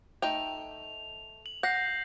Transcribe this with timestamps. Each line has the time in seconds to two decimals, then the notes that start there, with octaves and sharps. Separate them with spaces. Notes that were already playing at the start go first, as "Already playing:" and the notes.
0.22 A3 D#4 G5 F7
1.46 F#7
1.63 F#5 G6 A#6 C7